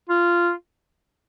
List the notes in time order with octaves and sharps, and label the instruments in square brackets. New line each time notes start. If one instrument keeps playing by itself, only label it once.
[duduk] F4